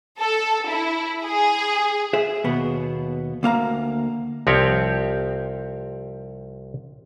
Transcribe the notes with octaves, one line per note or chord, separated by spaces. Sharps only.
A4
E4
G#4
G#4 C5 E5
D#2 B2 B3
D2 A#3 F5 A#5
C2 F3 C4 G4 C#5